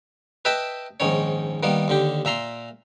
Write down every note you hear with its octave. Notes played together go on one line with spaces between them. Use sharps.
B4 D#5 E5 G5 A5 B5
A#1 G#2 D#3 C#4 C#5
D#3 G3 A#3 B3
D#2 D3 G4
A#2 E5 A#5 C6